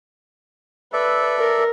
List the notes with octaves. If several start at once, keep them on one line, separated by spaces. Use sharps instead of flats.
A4 B4 D5 E5
A#4